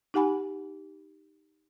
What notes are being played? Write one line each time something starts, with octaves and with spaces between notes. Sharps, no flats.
D#4 G4 F#5 G#5 B5